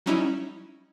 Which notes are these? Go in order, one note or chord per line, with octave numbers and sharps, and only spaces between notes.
F#3 G3 C#4 D#4 E4